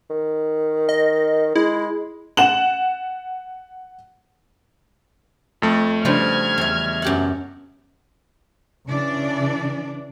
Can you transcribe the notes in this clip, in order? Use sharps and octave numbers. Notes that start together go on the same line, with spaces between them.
D#3
D#5
G#3 E4
F#5 E7 F#7
F2 A3
C#3 F3 G3 D4 F4 F6 G#6
E2 E5
F#2 G4 F#5
C#3 E3 D4 D5